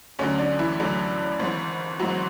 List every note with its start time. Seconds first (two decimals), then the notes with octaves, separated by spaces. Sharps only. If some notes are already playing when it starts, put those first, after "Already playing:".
0.19 D2 D3 F#3 C#4
0.38 D4
0.59 E3 E4
0.80 D2 D3 F#3
1.39 G#1 G#2 E3
1.99 G#1 G#2 E3 F#3 F#4